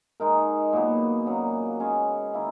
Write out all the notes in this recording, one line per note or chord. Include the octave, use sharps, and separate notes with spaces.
G#3 D#4 A#4
A#2 F#3 B3
C#3 F#3 A#3
G#3 C#4 G#4
D#3 A#3 E4